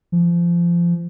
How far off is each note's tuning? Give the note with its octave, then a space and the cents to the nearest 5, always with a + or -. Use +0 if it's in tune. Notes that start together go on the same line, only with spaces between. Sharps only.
F3 -25